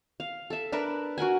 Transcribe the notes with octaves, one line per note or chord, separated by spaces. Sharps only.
F5
A4 E5
D4 A#4 B4 E5
F#4 A#4 F#5 G#5